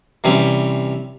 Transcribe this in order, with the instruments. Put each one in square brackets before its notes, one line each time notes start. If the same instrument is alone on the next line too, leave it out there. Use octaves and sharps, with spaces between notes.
[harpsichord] C3 E3 G3 C4 C#4